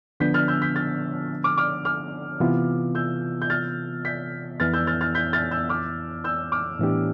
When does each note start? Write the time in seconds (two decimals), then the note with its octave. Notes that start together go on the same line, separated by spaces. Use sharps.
0.20 D3 F3 B3 D4 G6 B6
0.34 F6 A6
0.48 E6 G6
0.62 G6 B6
0.76 F6 A6
1.44 D6 F6
1.57 D6 F6
1.85 D6 F6
2.40 C3 E3 B3 F4
2.95 E6 G6
3.42 G6
3.50 F6 A6
4.05 G6 B6
4.60 F2 E3 B3 E4 F6 A6
4.74 E6 G6
4.87 F6 A6
5.01 F6 A6
5.15 G6 B6
5.33 F6 A6
5.51 E6 G6
5.69 D6 F6
6.24 E6 G6
6.52 D6 F6
6.79 A2 E3 B3 D4 G4